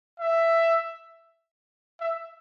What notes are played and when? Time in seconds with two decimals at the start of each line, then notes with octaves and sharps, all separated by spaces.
0.20 E5
2.00 E5